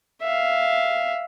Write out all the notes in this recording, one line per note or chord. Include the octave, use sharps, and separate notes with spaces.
E5 F5